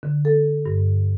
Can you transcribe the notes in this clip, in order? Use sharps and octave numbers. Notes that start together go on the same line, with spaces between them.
D3
A4
G2